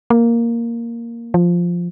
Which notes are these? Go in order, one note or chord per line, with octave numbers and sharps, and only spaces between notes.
A#3
F3